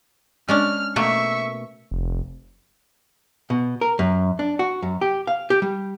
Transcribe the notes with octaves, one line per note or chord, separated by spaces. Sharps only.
G#3 C#4 D4 F6
B2 A3 A#3 E5 C#6
F1
B2
A#4
F#2
D4
F#4
F#2
G4
F5
G4
G3